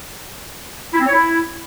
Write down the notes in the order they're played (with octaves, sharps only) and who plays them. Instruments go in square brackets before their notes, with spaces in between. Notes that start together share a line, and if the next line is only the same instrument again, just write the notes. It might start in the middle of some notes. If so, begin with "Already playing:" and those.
[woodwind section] E4
C4
C#5
E4